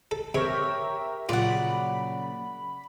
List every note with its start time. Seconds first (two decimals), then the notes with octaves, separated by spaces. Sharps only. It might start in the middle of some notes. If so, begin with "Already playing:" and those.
0.11 A4
0.35 C3 G4 A#4 C#5 E5
1.29 A#2 C#3 F#3 F4 D5 F#5 B5